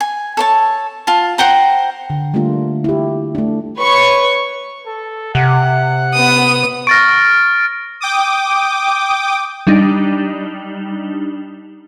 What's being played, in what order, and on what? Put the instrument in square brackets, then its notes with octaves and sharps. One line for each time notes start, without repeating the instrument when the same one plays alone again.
[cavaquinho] G#5
A4 C#5 A5
F4 A5
C5 F#5 G5 A#5
[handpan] D3
G3 A3 A#3 D4 F4
E4 G4
A3 D4
[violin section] B4 C#5 C#6
[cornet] A4
[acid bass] C3 [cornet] F#5
[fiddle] B3 D#6
[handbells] C#6 A#6 [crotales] F6 A6 D7
[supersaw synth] G5 D6 D#6
[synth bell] G3 D4 D#4